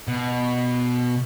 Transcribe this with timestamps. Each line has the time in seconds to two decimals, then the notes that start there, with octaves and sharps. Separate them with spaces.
0.08 B2